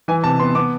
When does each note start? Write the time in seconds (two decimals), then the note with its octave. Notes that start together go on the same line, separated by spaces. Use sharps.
0.08 E3 G#5
0.24 C3 A5
0.40 B3 C6
0.55 B3 D6